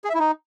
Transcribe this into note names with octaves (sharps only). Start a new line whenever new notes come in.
G#4
E5
E4
D#4